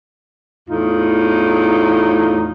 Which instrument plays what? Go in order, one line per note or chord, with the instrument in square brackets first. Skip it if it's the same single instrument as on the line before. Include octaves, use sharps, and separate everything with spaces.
[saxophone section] E2 A2 D#4 F4